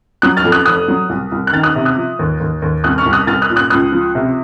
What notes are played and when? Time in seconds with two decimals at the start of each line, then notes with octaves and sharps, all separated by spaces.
0.22 F#3 D#6 F#6
0.37 F6 A6
0.44 F2
0.52 D#6 F#6
0.65 F1 D#6 F#6
0.88 F#3
1.09 C2
1.32 C2
1.47 F#6
1.53 D#3 F6 A6
1.63 D#6 F#6
1.75 C3
1.85 D#6 F#6
1.96 F3
2.19 D#2
2.40 D#2
2.62 D#2
2.84 C2 D#6 F#6
2.98 C#6 F6
3.06 C2
3.13 D#6 F#6
3.27 C2 F6 A6
3.42 D#6 F#6
3.50 A#2
3.56 D#6 F#6
3.70 C#2 D#6 F#6
3.92 F3
4.15 C3